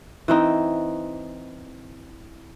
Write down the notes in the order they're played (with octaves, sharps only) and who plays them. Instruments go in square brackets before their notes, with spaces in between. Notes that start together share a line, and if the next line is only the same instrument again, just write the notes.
[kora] E3 C4 D#4